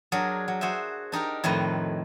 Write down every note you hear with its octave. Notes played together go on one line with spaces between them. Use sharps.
F#3 D4 G#4 A#4
F#3
F#4 G#4 C5 E5
D4 D#4 G4 A#4
F2 A2 D#3 B4 A#5